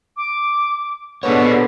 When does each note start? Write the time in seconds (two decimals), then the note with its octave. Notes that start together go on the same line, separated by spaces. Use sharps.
0.17 D6
1.23 B2 D3 B3 G4 G#4 C#5 C#6